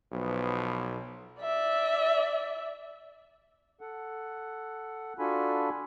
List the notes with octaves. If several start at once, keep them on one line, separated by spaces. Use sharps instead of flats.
B1 F3 B3
D5 E5
A4 F#5
D4 F4 F#4 A4 G#5 B5